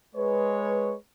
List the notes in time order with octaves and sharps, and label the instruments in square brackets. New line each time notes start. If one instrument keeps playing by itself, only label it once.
[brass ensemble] G#3 B4 C#5